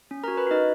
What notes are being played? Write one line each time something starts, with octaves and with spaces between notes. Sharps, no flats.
C#4
F#4 A#4 A#5
B4 B5
D#4 F#4 D#5